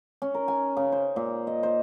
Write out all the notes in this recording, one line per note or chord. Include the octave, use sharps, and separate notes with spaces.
C#4
A#4
G#5
C#3
C5
A#2
D#5
C5